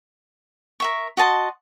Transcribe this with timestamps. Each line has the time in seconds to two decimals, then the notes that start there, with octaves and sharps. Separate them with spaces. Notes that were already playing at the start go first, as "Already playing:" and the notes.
0.80 A#4 E5 C#6
1.17 F#4 D#5 A5 C6